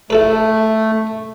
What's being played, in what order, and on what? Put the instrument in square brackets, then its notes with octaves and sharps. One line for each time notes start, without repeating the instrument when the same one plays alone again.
[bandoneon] A3 [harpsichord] E4 A4 B4